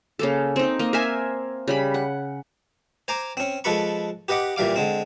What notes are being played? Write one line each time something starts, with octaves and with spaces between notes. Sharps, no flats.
C#3 A#3 A4
C4 D#4
A#3 D#5
A#4 C5 E5 G#5
C#3 G3 B5
F#5
C5 G#5 A#5 D6
C4 C#4
F3 G#3 A4 B4 B5 C#6
G4 B4 D#5 F#5 D6
A#2 E3 G3 F5 D6
D3 G#3 C4